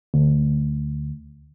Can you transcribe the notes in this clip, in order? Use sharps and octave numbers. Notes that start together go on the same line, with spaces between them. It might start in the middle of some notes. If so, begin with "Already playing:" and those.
D2